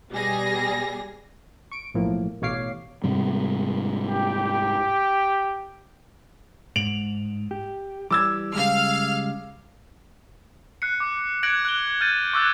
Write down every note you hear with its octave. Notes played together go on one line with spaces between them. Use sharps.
B2 G3 G#4 A#6
C#6 D7
B1 A2 F3 A#3
A1 B2 C#5 F5 D6 C7
G#2 C3 G3
G4
G#2 D7 F7 F#7
G4
E3 G3 D6 E6 G#6
C#3 G3 G#3 F5 F6
F#6 C7 C#7
D6
F#6 G#6 A#6 C#7 D7 F#7
F#6 D7 F#7 G7
F6 G6 A6 D#7
C#6 D6 E6 F#6 G#6 A6